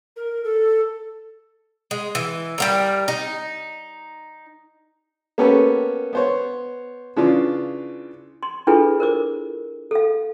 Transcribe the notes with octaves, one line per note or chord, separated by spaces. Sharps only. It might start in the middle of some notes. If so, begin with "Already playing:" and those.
A#4
A4
G#3
E3
G3 A#3 A#4
D#4
A#3 B3 C#4 G4 A4 B4
B3 C5 C#5
C#3 E3 D4 F4
C6
D4 E4 F4 G#4 A4 B4
A#4 C5 D6
A4 F5